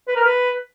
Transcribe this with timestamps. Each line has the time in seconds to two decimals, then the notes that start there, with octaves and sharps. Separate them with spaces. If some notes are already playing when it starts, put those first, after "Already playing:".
0.08 B4
0.16 A#4
0.24 B4